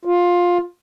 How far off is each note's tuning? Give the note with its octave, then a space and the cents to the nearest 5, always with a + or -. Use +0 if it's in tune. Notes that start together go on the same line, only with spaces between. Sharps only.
F4 +15